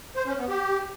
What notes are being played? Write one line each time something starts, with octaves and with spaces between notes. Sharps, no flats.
C5
C#4
B3
G4